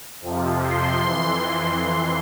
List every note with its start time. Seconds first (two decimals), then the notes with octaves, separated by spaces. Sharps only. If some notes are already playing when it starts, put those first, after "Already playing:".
0.22 F2 C3 F3
0.61 C6
1.03 F2 E3